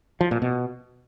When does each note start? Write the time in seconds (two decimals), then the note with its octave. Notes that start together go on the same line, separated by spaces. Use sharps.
0.21 F3
0.31 A#2
0.42 B2